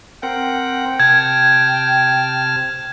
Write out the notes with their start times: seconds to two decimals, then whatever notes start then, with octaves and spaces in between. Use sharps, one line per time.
0.23 C4 A#4 F#5 G5
1.00 C3 A5 F6 G#6